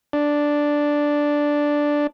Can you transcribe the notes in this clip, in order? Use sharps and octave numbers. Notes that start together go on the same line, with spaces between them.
D4